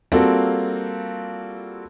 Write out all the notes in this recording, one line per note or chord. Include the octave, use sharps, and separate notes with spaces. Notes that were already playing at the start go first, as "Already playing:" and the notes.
G3 A#3 C4 F4 F#4 A4